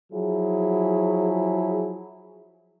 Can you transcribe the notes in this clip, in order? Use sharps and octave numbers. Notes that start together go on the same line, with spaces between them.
F3 F#3 E4 G#4